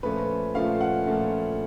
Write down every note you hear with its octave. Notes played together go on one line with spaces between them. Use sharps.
A#2 F3 A3 C#4 B4
A#2 F3 A3 C#4 F5
F#5
A#2 F3 A3 C#4